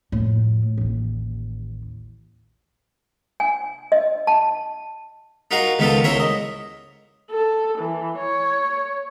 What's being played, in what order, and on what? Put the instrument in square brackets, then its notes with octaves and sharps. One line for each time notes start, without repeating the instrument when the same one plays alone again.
[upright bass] F2 A2
A1 D#2
[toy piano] G#5
D#5
A5
[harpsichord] D#4 F4 F#4 A#4 F5 A#5
C#2 D#3 B3 D#4 F4 A4
C#2 E4 A#4 C5 C#5 E5
D#5
[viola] A4
E3
C#5